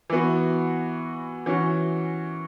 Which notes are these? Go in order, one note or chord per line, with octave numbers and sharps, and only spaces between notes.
E3 B3 F#4
E3 C#4 F#4